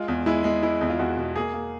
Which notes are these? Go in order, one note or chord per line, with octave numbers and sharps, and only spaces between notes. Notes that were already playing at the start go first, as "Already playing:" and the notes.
Already playing: G#3 F4
E2
G#3 E4
G#3
G#3 E4
E2
F4
E2 F#4
B2
A#3 G#4
A#3